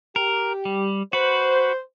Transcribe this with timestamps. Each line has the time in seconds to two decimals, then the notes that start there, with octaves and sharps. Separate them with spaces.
0.16 G4 A#4
0.65 G3
1.13 F#4 B4 C5